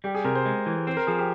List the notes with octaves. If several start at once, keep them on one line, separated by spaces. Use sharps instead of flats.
G3 G4
G#4
C3 A#4
C5
G#3
E3
C4 C5
A#4
F3 G#4
G4